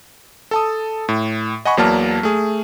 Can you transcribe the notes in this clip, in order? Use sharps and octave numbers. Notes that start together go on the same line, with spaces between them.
A4 A5 D#6
A2
D#5 F#5 G#5 B5 C#6
E2 F#3 A#3 D5 A5 F6
A3 G#4